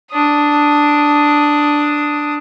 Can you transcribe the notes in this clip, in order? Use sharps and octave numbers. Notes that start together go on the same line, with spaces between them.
D4 D#6